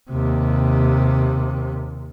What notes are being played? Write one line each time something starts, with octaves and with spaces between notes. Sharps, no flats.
D#2 C3